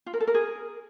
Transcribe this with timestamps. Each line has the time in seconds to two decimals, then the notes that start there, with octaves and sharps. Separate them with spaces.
0.06 F4
0.13 A#4
0.20 A4
0.27 A#4
0.34 G#4